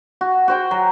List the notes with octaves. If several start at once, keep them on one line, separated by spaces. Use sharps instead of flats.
F#4
F#4 C5 G5
F#3